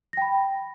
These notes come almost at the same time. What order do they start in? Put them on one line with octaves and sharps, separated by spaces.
A#6 G5 B5